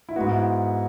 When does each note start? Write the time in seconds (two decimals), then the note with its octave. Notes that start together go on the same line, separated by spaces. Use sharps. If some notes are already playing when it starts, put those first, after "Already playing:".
0.09 E4
0.16 G#2 G#3 B3 F#4
0.31 E4